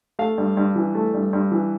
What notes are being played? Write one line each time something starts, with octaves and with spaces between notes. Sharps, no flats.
A3 F5
G2
G2
E3
A3
G2
G2
E3